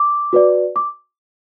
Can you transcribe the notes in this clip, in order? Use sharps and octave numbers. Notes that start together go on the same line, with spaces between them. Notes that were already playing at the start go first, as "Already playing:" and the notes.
Already playing: D6
F#4 B4 D5
D6